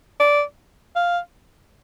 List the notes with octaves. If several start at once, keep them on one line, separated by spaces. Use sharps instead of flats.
D5
F5